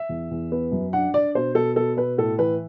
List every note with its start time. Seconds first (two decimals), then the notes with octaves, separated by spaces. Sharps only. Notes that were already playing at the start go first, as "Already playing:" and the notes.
Already playing: E5
0.09 E2
0.31 E2
0.52 B3
0.72 F#2
0.93 D4 F#5
1.14 D4 D5
1.35 B2 C5
1.55 B2 A4
1.76 B2 A4
1.97 B2 B4
2.18 A2 A4
2.39 E3 B4